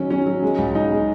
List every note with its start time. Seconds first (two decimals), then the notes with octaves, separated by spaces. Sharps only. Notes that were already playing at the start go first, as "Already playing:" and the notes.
Already playing: D#3 F#3 C#4
0.10 F#3 C#4
0.26 F#3
0.42 G#3
0.58 C#2
0.75 C#2 D#4
0.91 G#3